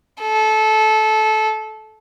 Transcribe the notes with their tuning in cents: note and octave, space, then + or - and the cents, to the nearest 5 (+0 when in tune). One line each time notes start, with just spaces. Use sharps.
A4 -20